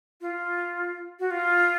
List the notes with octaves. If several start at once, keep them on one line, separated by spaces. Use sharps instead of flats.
F4
F#4
F4